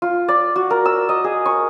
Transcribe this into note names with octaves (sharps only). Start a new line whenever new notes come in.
F4
D5
F#4
A#4
E6
D#5
G#4
C#6